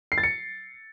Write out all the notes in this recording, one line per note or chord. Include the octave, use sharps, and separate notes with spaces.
C7
A6
C#7